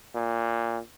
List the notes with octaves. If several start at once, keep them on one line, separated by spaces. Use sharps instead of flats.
A#2